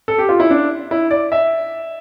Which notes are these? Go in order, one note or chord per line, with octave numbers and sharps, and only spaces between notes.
A4
G4
F4
E4
D4
E4
D5
E5